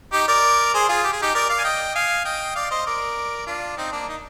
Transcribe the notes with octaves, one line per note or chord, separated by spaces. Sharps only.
D#4 G4
A#4 D5
G#4 C5
F4 G#4
G4
G#4
D#4 G4
A#4 D5
D5 F5
G#5
D#5 G5
F5 G#5
D#5 G5
D5 F5
C5 D#5
A#4 D5
D4 F4
C4 D#4
A#3 D4
D#4